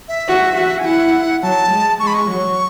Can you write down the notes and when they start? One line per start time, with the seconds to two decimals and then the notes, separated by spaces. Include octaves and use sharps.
0.08 E5
0.28 F#4
0.56 F#4
0.78 G#5
0.85 E4 F#5
1.43 F#3 A5
1.71 G#3
2.00 G#3 C#6
2.07 B5
2.14 C#6
2.29 F#3